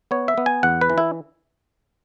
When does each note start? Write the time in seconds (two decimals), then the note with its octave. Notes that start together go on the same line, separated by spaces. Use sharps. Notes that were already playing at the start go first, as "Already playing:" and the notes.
0.11 B3 C#5
0.28 E5
0.38 B3
0.46 G#5
0.63 E2 F#5
0.81 B4
0.90 E3
0.98 E4